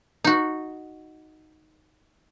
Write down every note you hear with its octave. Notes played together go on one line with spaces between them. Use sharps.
D#4 F#4